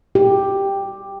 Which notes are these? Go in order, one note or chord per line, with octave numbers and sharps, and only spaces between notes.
G4